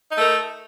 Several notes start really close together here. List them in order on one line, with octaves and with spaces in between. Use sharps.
D#4 A3 A#4